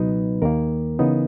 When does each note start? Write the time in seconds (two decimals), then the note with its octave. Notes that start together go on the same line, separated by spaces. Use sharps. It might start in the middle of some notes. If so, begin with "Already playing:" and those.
Already playing: C#2 B2 F#3 B3 D#4 B4
0.42 D#2 D#3 A#3 A#4
0.99 C#3 E3 B3 D#4